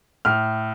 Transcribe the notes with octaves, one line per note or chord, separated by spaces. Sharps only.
A2 F6